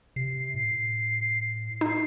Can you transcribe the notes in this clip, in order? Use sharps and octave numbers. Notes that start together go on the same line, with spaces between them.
C3 C7
A2
D#4